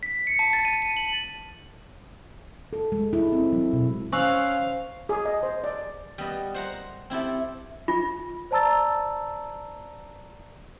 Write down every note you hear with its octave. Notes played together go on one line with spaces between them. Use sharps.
B6
C#7
A5
A6
D#7
D#7
F#7
A4
G#3
E4
C4
F#3
B2
C#4 C5 F5 C#6 E6 F#6
G#4
D#5
C5
D5
G3 B3 D#5
C5 F#5 A#5
C4 E4 G4 A4
F4
C5 D5 A5 A#5 E6 A6